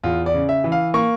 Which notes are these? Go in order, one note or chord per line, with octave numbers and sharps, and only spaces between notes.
E2 F4
D5
C#3
E5
E3
F5
A#3 C#6